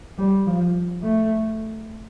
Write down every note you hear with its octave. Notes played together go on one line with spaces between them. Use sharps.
G3
F3
A3